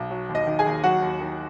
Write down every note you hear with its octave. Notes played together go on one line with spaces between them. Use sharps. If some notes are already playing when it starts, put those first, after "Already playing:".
Already playing: B1
F#3
D#2
D#5
D#3
G#4 G#5
D#2
F#3 F#4 F#5
D#2
D#3